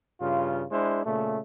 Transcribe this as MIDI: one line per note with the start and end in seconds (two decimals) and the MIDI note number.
0.20 0.64 43
0.20 0.64 49
0.20 0.64 65
0.71 1.02 56
0.71 1.02 62
0.71 1.02 64
0.71 1.02 72
1.05 1.38 46
1.05 1.38 49
1.05 1.38 57